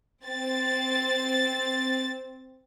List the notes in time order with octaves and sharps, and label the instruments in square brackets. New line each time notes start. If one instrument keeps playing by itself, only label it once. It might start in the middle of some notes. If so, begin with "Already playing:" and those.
[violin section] C4 A6